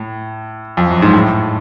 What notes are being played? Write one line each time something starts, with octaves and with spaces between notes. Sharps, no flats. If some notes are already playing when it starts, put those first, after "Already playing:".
Already playing: A2
F2
F#2
G#2
A2